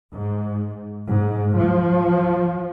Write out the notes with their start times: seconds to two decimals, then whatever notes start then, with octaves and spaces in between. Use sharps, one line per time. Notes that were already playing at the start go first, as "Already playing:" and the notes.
0.12 G#2
1.10 G#2
1.60 F3